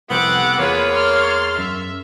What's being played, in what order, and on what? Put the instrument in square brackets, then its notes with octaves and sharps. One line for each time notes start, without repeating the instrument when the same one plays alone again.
[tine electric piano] C2 F2 C3 [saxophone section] B3 C4 [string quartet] F#5 D6
[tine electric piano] E2 G#4 [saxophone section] A#3 C#5 [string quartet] F4 B4
[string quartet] C6 F6 A6
[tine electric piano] F#2 [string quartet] E5